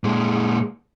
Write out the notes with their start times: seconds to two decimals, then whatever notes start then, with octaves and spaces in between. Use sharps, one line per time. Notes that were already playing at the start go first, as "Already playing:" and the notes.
0.04 A#2 G#3